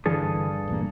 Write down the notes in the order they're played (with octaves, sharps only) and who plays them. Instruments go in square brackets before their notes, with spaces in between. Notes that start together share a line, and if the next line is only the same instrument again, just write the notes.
[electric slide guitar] G2 G#4 A4 [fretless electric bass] D3 E3
[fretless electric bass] A#1 E2 A#3